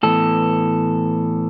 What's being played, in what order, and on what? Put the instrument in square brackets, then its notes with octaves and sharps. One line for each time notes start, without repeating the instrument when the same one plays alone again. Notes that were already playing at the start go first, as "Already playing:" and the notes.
[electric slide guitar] A2 E3 B3 A4